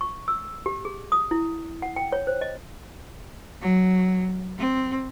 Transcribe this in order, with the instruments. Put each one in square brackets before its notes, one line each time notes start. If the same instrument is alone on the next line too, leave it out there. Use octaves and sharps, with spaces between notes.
[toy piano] C#6
E6
G4
G#4
D#6
E4
F#5
G5
C#5
C5
D#5
[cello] F#3
C4